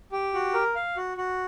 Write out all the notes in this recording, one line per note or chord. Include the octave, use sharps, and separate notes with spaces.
G4
F#4
A#4
F5
F#4
F#4